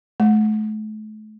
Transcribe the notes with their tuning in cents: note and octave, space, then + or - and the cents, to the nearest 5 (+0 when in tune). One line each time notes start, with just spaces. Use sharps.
A3 -40